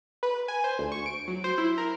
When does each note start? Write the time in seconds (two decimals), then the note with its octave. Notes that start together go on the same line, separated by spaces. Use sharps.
0.23 B4
0.48 G#5
0.64 C5
0.79 D2
0.92 C#6
1.06 D7
1.28 F#3
1.44 C5
1.58 E4
1.78 A#4